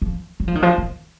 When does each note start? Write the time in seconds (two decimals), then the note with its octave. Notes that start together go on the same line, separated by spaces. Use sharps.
0.02 F3
0.40 F#3
0.48 F3
0.55 D#3
0.62 F3
0.78 D#3